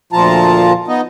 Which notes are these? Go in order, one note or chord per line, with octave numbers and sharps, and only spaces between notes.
D2 A#2 F3 F4 A5 A#5
B3 D#4 D#5